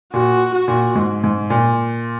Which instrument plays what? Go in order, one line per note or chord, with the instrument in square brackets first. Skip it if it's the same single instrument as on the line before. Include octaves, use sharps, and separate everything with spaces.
[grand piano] A#2 [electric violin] F#4
[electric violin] F#4
[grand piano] A#2
G#2
G#2
A#2